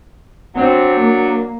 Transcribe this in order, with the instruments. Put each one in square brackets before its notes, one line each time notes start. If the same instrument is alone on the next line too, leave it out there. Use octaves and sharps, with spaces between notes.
[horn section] F#3 D4 [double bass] C4
[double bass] A#3